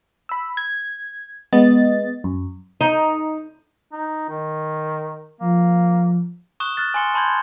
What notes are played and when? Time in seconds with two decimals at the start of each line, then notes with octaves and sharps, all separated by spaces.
0.29 B5 E6
0.57 G#6
1.53 G#3 B3 D#5 A6
2.24 F#2
2.81 D#4
3.93 D#4
4.29 D#3
5.40 F3 A#3
6.60 C#6 D#6 F#6 E7 G7
6.77 F6 F#6 A6
6.94 G#5 C6 C#7 G7
7.14 A5 B5 C6 G6 G#6